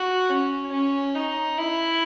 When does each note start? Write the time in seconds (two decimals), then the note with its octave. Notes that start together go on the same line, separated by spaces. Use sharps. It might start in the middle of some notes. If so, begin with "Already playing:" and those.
Already playing: F#4
0.30 C#4
0.72 C#4
1.15 D#4
1.58 E4